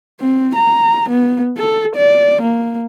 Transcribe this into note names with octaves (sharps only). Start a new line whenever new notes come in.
C4
A#5
B3
A4
D5
A#3